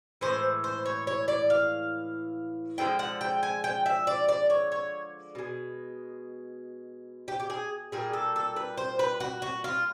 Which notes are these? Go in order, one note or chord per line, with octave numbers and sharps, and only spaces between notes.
A2 E3 G#3 C5
C5
C#5
C#5
D5
F5
D3 F3 G#3 G5
F#5
G5
G#5
G5
E5
D5
D5
C#5
C#5
B2 G#3
G4
G4
G#4
A#2 G3 G#4
A4
A4
B4
C5
B4
F#4
F#4
F4